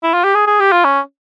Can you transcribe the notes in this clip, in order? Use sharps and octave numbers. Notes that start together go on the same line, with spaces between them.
E4
F4
G4
G#4
G#4
G4
F4
C#4